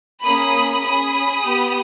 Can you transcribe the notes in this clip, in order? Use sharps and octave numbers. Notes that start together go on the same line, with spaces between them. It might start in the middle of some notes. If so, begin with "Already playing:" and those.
A#3 C#4 G#4 B5 D#6
C#4 G#4 B5 D#6
B3 G4